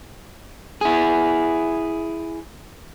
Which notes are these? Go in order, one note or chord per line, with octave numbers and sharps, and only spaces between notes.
E4 G#4